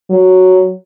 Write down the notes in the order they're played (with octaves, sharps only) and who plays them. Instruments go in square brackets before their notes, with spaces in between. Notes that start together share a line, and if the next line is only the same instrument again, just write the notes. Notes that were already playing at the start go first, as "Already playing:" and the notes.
[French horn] F#3